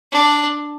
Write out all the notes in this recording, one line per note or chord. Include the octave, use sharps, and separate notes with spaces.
D4